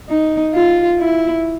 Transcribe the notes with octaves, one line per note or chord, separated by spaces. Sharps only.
D#4
F4
E4